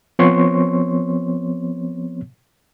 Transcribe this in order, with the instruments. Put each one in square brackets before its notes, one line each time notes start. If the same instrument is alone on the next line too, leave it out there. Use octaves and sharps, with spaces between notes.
[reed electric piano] F3 B3 C4 C#5 C6 C#6